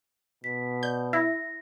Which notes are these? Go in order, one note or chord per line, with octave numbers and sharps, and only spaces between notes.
B2 B6
D5 G6
E4 A#6